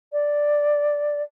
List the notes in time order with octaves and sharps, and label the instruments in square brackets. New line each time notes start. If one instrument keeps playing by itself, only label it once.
[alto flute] D5